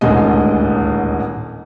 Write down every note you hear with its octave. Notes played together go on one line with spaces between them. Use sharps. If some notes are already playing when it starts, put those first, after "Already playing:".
D#1 A1 D2 G#2 G#3 D#5